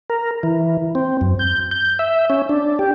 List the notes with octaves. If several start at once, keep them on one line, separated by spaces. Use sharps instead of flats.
A#4
E3
C4
F#2
G6
G6
E5
C#4
D4
G4